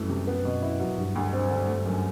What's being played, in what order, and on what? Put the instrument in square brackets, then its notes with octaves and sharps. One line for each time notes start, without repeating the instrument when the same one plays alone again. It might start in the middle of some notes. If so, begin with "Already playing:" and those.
Already playing: [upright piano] C2 E3 A3 [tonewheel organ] F#2
[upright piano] C3
B3
B2
E4
F#3
[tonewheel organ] G2 [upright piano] F#3
[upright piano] D2
C4
D3
A3
F#2